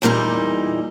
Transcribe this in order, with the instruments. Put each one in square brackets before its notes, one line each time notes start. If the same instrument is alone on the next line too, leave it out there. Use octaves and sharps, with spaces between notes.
[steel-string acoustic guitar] E2 A#2 G3 D#4 E4